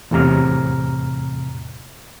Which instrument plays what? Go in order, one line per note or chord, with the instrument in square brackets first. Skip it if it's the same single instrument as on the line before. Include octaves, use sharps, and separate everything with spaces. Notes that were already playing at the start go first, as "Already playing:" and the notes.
[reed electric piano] E2 A2 C3 A#5 F6